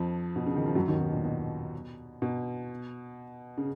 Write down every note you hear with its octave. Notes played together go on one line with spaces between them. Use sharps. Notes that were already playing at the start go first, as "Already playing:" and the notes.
Already playing: F2 F3
B2
C#3
D#3
F3
F#2 F#3
D#2 D#3
B2
A#2
B2
B2
C#3